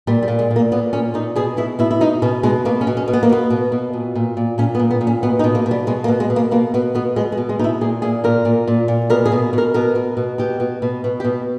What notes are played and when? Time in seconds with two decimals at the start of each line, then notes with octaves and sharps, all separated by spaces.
0.07 A#2 G3
0.23 G3
0.28 A#2
0.39 G#3
0.51 A#2
0.56 A#3
0.72 A#2 B3
0.93 A#2 C#4
1.14 A#2 D#4
1.36 B2 G#4
1.57 B2 E4
1.79 B2 E4
1.91 E4
2.01 B2 D#4
2.22 B2 C#4
2.43 B2 G#3
2.65 B2 A#3
2.81 C#4
2.87 B2
2.97 C#4
3.08 B2
3.13 B3
3.23 A#3
3.29 B2 B3
3.50 B2
3.72 B2
3.93 A#2
4.15 A#2
4.37 A#2
4.58 A#2 C#4
4.75 B3
4.79 A#2
4.91 B3
5.01 A#2
5.07 C#4
5.23 B2 B3
5.39 D#4
5.44 B2
5.55 A#3
5.66 B2
5.71 G3
5.87 B2 G#3
6.04 A#3
6.08 B2
6.20 G#3
6.30 B2
6.36 A#3
6.51 B2 A#3
6.74 B2 B3
6.95 B2 B3
7.16 B2 G#3
7.32 G#3
7.37 B2
7.49 G#3
7.59 B2 D#4
7.64 E4
7.81 A#2 G#4
8.02 A#2 G#4
8.24 A#2 A#4
8.45 A#2
8.67 A#2
8.88 A#2
9.10 B2 A#4
9.26 G#4
9.32 B2
9.53 B2 A#4
9.74 B2 A#4
9.95 B2
10.17 B2
10.38 B2 G4
10.60 B2
10.82 B2
11.04 B2
11.20 G4
11.24 B2